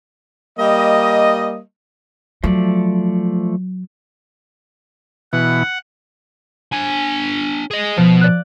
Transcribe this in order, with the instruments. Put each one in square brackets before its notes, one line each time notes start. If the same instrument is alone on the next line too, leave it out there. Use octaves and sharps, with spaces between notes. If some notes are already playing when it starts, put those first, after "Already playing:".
[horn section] G3 A#3 D#5
[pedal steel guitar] F3 A3 D5 [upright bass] F#3
[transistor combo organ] B2 E3 [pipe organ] F#5
[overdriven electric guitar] D4 G#5
G#4 D#5
[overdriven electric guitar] B2 [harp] F3
[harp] D5 F#6